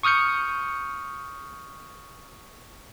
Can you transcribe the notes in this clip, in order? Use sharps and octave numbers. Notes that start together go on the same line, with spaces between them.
C#6 D#6 F6 G6 C#7